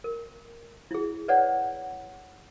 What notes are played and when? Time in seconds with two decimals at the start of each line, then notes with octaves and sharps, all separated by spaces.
0.04 A#4
0.91 E4 G#4
1.28 B4 C#5 D5 F#5